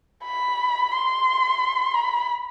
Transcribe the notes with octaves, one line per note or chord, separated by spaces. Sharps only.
B5
C6
B5